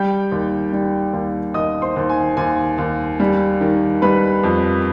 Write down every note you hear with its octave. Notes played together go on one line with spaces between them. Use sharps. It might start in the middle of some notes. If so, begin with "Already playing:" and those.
Already playing: G3 G5 G6
D#2
G3
D#2
D#2 D#5 D#6
C5 C6
D#2
G#5
D#2 G#5
D#2
G3
D#3
G3 B4 B5
F2